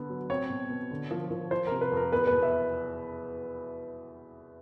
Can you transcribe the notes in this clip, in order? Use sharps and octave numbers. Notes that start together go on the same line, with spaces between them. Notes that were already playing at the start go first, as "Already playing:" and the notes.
Already playing: D3 B3
F#3
C4 C#5
B2
B2
D3
F3
F3
F3 C5
C3 A#4
B4
F2 A#4
E2 B4
B4
B2
E5